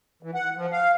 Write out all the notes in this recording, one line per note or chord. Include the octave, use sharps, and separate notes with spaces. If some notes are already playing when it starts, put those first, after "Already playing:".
E3
F#5
F3
F5